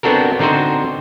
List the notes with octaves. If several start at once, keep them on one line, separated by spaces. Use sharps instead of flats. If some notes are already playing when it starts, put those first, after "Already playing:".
B3 C4 D4 F#4 A4 A#4
D3 C4 D#4 F#4 C5